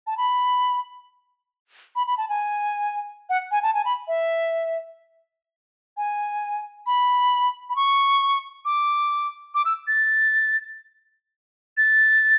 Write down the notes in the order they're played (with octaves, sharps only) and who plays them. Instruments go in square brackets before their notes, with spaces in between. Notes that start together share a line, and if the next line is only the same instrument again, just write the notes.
[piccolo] A5
B5
B5
B5
A5
G#5
F#5
G#5
A5
G#5
B5
E5
G#5
B5
B5
C#6
D6
D6
E6
A6
A6